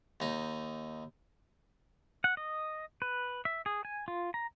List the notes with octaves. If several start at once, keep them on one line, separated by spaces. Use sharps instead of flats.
D#2 D#4
F#5
D#5
B4
E5
G#4
G#5
F4
A#5